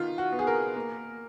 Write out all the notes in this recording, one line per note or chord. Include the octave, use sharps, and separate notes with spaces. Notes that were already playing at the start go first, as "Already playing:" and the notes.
Already playing: D#3 B3 F4
F#4
B3
G#4
A#4
A#3